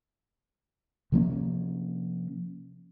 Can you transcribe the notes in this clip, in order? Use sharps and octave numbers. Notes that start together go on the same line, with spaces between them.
C3 F3 A#3 C#4